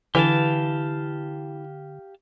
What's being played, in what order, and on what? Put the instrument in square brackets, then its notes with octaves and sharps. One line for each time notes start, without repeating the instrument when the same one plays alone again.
[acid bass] D3 [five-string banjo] E3 [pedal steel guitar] G4 F5 A5